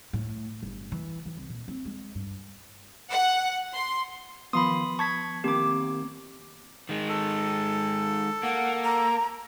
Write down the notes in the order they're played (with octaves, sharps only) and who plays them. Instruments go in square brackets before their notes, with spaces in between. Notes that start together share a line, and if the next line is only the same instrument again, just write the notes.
[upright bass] A2
G1
E3
E3
C2
A#2
C4
G#3
G2
[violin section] F#5
C6
[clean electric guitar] D#3 F5 C6 [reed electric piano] F3 B3 [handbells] B5 D#6
[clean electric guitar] A5 [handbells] C#6 G#6 B6
[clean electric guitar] D#3 A#3 C4 [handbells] G4 D6
[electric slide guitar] D#3 G#3
[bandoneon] A4
[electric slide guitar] A#3 [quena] F#5
[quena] A#5